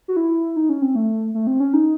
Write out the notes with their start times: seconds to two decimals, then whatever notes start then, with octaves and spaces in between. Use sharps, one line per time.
0.08 F#4
0.17 E4
0.56 D#4
0.69 C#4
0.82 C4
0.95 A3
1.35 A3
1.47 C4
1.60 C#4
1.73 D#4